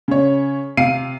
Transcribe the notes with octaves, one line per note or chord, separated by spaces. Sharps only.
C#3 C#5
C3 F5 C7 D#7